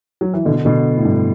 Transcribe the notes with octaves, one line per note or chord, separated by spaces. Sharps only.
F#3
E3
B2 D3
B2 D3
A2
G2